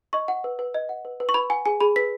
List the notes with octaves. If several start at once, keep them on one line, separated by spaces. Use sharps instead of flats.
D#5 C#6
F#5
B4
B4
D#5
F#5
B4
B4
C#6
B4 B5
F#5 G#5
G#4 G#5
G#4 B5
B4 B6